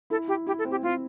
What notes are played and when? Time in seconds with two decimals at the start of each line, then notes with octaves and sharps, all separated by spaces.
0.10 E4 A4
0.28 E4 G4
0.47 E4 G4
0.59 A4
0.65 C4
0.71 G4
0.83 C4 F4